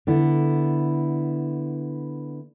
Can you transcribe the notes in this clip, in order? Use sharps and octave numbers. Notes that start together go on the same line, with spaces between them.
D3 B3 E4